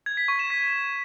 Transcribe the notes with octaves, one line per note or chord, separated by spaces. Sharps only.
G#6
B6
C#6
E7
B6